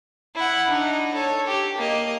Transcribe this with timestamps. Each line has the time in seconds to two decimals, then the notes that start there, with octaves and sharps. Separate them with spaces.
0.35 E4 F#5
0.70 D4 D#4
1.14 A4 C#5
1.47 G4
1.78 A#3 D#5